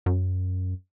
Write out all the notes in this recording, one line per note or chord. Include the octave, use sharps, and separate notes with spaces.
F#2